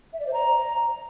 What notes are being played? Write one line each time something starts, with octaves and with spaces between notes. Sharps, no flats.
E5
D5
C5
A#5